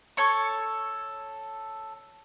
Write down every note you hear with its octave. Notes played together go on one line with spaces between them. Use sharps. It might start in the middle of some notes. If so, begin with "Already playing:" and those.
A4 C#5 C#6